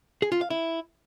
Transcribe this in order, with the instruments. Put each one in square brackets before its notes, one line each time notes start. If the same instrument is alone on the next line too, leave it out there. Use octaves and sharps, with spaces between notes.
[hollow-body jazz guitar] G#4
F4
F5
E4